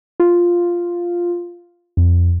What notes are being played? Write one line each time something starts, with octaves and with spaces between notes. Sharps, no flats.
F4
F2